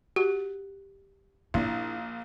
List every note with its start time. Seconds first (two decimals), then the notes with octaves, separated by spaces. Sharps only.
0.16 F#4 G4
1.54 A#1 D4 E4